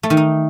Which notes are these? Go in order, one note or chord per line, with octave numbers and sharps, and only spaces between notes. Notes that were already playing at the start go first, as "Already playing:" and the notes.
A3
D#3
D#4